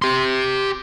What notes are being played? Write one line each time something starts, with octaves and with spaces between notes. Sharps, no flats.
G4 C6